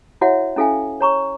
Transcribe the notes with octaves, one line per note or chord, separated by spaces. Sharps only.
E4 F#4 C#5 E5 F#5
C#4 E4 A4 E5 F5 G#5
C#5 A#5 C#6